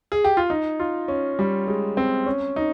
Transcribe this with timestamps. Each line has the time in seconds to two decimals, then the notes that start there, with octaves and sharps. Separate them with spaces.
0.12 G#4
0.24 G4
0.37 F4
0.50 D#4
0.80 F4
1.08 C#4
1.39 G3
1.68 G#3
1.97 C4
2.26 C#4
2.56 D#4